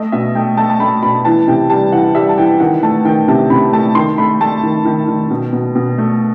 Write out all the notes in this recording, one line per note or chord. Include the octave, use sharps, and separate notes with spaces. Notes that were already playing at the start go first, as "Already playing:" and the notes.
Already playing: A3 D#5
B2 E5
A3 G5
A3 A5
A5
A3 B5
B2 B5
E3 A5
C3 G5
G3 A5
E3 F#5
G3 E5
A5
E3 G5
D#3 F#5
A3 A5
D#3 G5
C3 A5
C3 B5
A3 A5
D#3 C6
A3 B5
A3 A5
D#3
D#3
D#3
B2
B2
B2
A3